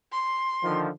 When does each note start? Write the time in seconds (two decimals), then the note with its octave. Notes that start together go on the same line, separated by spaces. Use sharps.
0.12 C6
0.64 D3 D#3 F3